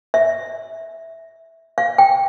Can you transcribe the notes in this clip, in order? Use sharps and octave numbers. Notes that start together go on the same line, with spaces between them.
E5
F5
G5